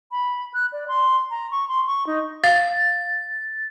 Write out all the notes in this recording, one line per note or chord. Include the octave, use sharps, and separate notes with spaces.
B5
F#6
D5
C6
A#5
C#6
C6
C#6
D#4
F5 A6